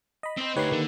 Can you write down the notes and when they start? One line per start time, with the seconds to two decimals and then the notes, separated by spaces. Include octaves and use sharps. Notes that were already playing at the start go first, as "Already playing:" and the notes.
0.23 D#5 B5
0.37 C4 C5
0.56 D2 D#4 G4 B4 C#5 C6
0.72 D3 D#3 A#3